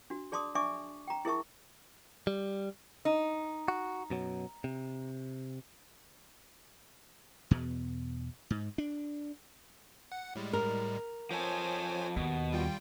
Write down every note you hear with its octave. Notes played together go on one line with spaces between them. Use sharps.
D4 F#4
G#4 D5 A5 C6 D6 D#6
D4 D5 E5 G#5 C#6 D6
G5 A#5
E4 G#4 A#4 E5 A5 C#6
G3
D#4
F#4
F#2 B2 F#3
C3
E2 B2
G#2
D4
F#5
A2 G3 G#3
A#4
F3 A4 C5 C#5 G#5
D#2 B2
G3 F4 G5